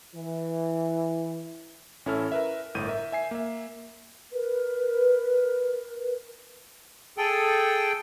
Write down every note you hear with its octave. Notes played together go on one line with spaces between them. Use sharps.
E3
A1 C#4 E4 A4 F6
A#4 B4 E5
G1 A2 G6 D#7
A#4 E5
E5 G#5 C7
A#3 E5
A#4 B4
G#4 A4 G5